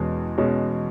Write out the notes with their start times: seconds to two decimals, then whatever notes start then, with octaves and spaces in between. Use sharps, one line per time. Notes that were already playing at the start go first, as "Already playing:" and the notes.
Already playing: E2 B2 G#3 C#4
0.38 B2 G#3 C#4